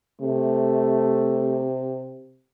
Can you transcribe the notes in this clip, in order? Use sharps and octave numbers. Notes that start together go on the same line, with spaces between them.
C3 A3